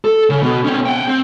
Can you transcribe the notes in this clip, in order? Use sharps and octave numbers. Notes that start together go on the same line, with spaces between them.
A4
C#3
B2
C4 C#4
F#5 G5
C4